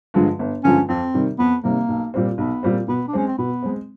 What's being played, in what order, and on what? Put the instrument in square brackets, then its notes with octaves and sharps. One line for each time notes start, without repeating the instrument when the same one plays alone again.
[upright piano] G2 D3 F3 G#3
G1
[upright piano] G2 D3 F3 G#3 [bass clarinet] C#4
[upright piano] F2 [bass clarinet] C4
[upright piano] C3 D#3 G3
[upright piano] F2 [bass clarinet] B3
[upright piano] C3 D#3 G3 [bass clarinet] A#3
[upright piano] B1
A#2 G3 C4
[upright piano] B1 [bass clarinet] B3
[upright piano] A#2 G3 C4
[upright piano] B2 [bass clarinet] B3
[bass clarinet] D4
[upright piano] G#3 C4 [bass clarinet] C#4
[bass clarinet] C4
[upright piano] B2 [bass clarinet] B3
[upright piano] G#3 C4